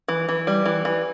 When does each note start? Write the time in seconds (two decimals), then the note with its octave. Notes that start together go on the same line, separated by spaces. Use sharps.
0.08 E3
0.29 E3
0.47 G3
0.66 E3
0.85 E3